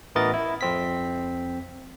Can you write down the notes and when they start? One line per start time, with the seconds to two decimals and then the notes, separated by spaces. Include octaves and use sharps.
0.15 A1 E3 B3 A#4 D#5 A6
0.34 E4
0.61 F2 C4 B6